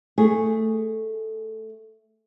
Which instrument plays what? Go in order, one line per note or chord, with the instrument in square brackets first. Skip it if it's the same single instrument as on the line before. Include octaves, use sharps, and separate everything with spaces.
[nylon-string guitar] A3 G#4